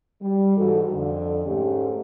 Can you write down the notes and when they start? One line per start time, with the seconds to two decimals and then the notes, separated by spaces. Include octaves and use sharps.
0.22 G3
0.57 G#2 E3 F#4 A4
0.93 F2 D3
1.46 G#2 A3 C#4 G4